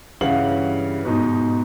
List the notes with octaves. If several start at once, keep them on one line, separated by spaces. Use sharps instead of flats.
G2 C#3 E3 F5 F#5 F#7
G#2 B2 D#4